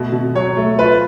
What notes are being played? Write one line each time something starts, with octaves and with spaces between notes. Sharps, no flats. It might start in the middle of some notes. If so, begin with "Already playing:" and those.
Already playing: B2 A3
B2
F#3 C#5
A3
F4 B4